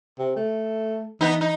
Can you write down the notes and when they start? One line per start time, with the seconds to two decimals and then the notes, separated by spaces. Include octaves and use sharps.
0.19 C3
0.36 A3
1.21 E3 B3 D#4
1.41 D#4